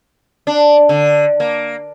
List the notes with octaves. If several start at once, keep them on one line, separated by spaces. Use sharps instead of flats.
D4
D3
A#3